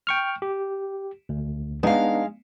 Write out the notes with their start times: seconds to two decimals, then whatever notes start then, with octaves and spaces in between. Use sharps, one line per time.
0.07 G5 C#6 F6
0.42 G4
1.29 D2
1.83 G#3 B3 D4 D#4 F5